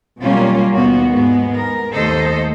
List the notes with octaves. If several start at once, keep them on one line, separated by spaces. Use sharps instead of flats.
B2 F#3 G3 A#3 C#4 F4
D#2 B2 A#3 B3 F#4
G#2 G#3 B3
A#4
D#2 A3 A4 C5 D#5